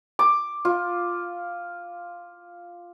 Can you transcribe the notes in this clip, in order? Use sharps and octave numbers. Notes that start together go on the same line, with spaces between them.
D6
F4